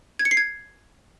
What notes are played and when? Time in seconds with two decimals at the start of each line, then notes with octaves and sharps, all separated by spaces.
0.19 G#6
0.25 C#7
0.31 C7
0.37 G#6